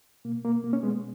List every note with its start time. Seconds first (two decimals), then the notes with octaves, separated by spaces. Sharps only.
0.25 B2 A#3
0.45 A#3
0.64 A#3
0.73 C#4
0.83 G#3 B3